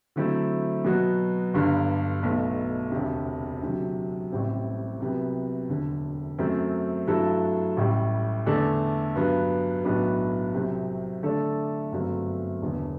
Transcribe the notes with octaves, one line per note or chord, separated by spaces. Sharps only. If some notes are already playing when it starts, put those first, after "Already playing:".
D3 F#3 A3 C4 E4
B2 F#3 B3 F#4
G1 G2 D3
B1 B2 A3
E1 D2 C3
D2 C3 F#3
A1 A2 G3 C4 G4
C2 C3 F#3 B3
E1 D2 D3
F#2 F#3 A3 C4
G2 F#3 A3 E4 A4
A1 A2 G3
E2 D3 A3 D4 A4
G2 F#3 B3
B1 A2 F#3 B3 D4
C2 C3 F#3 C4
D3 A3 D4 A4 D5
G1 F#2 F#3 A3 C4
E1 E2 D3